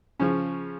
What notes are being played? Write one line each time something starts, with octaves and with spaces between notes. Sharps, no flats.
C#3 F3 C#4